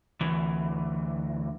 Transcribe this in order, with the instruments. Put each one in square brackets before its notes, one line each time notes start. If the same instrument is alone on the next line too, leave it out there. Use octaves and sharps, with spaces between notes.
[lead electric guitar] D2 E3